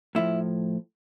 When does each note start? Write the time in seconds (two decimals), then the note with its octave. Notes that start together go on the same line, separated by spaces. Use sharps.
0.15 A2 F3 E4